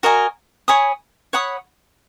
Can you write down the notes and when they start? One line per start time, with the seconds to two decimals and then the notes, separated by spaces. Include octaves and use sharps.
0.03 F#4 A#4 D#5 G#5
0.68 C#5 G#5 B5 D#6
1.33 C#5 F#5 B5 D#6